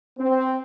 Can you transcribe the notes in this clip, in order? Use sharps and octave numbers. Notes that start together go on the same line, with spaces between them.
C4